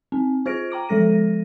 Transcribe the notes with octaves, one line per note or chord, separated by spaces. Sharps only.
C4
F4 C5 F6 A#6 D7
G5 A#5 D6 D7
F3 G#3 A4 A#6 D#7